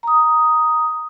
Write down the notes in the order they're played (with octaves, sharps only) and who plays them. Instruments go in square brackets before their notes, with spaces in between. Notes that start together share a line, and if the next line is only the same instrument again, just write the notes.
[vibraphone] A#5 D#6